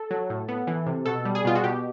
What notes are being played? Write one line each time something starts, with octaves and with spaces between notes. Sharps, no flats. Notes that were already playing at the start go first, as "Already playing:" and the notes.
Already playing: A4
F#3
A2
B3
E3
C3
B2 A4
G3
G#4
B2 F4
F#4
B2 G4